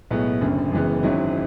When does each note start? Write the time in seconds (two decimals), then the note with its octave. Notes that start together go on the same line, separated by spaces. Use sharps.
0.10 B1 A2 G#3 B3
0.41 F#1 F#2 D3
0.72 F#1 F#2 E3 G#3 B3
1.03 G#1 G#2 F#3 C#4 E4